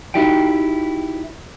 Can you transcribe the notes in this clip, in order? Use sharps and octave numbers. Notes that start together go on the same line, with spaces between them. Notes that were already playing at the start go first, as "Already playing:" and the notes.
D#4 E4 F#4 G4 D5 G5